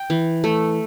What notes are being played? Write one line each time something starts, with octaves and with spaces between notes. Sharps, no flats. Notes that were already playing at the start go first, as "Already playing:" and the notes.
Already playing: G5
E3
A3